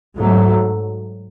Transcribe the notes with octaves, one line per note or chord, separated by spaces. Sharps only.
G#2 F#3 A3